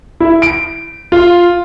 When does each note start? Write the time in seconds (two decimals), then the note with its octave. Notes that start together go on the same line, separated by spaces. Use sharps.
0.20 E4
0.42 D7
1.12 F4